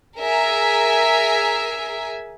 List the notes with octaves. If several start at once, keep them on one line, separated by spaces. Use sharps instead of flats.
G#4 A#4 E5 G#5